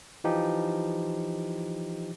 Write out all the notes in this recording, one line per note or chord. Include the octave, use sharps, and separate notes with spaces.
E3 F3 D#4 G4